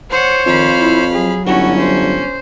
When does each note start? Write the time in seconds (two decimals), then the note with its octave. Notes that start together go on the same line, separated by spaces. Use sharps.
0.11 C5 C#5 F#5
0.46 F2 D#3 F5 B5
0.77 E4
1.13 F#3 G#4
1.46 G1 C#4 E4 F#4
1.80 C5